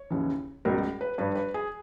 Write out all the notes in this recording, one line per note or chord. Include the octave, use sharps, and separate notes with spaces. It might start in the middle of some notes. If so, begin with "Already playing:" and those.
Already playing: C#5
D#2 C#3 E3
C#2 B2 G3 A#4
B4
G2 G3 B4
B4
G#4